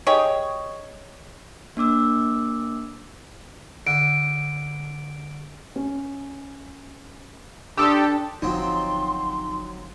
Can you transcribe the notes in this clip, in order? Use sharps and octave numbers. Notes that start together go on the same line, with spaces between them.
D#4 G4 G#4 C#5
A#3 D4 D6 E6
D3 D7
C#4
D4 G4 A4 C6 D#6 E6
G1 F3 F#3 C4 D#4 D#5 G5 C6